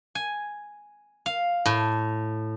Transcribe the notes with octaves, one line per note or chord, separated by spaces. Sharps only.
G#5
F5
A2